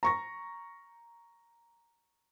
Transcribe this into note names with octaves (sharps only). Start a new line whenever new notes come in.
A#5 C#6 A#6